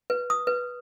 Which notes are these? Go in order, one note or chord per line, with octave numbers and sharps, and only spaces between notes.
B4
D#6
B4